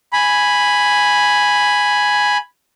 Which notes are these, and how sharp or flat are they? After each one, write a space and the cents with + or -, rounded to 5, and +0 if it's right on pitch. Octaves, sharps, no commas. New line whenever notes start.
G#5 +0 B5 +0